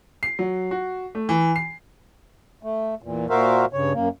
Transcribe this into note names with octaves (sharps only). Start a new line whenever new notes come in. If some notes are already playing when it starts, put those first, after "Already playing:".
C7
F#3
F#4
A3
E3
C7
A3
E2 A#2
A#2 F#4 A#4 C5 E5 F5
G2 C#3 C#5
F#2 A#3